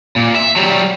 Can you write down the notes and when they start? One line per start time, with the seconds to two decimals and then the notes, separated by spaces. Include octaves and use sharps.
0.16 A#2
0.35 E5
0.56 F#3 G3